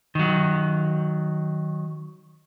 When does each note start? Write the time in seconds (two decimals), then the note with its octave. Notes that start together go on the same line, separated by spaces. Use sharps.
0.15 D#3 F#3